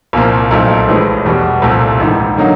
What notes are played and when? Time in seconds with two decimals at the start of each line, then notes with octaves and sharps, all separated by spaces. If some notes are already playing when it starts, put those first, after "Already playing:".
0.13 C2 A#2 F3 A#3
0.51 B1 A#2 F3 A3
0.88 A1 A2 F3 G#3
1.25 E2 B2 G3
1.62 C2 A#2 F3 A3
2.00 A#1 G#2 E3
2.37 D3 F#3 A#3 D#4